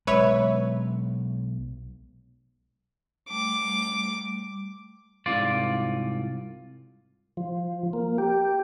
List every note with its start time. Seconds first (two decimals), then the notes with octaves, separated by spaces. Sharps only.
0.07 B1 G#3 B4 C#5 E5
3.30 G3 A3 D6
5.26 C2 G#2 F4 D5
7.37 F3
7.93 A#3
8.18 G4